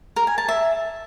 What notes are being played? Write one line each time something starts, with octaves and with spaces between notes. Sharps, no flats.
A#4
G#5
A5
E5